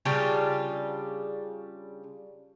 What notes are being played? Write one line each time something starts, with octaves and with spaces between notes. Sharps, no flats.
C#3 G3 D4 F4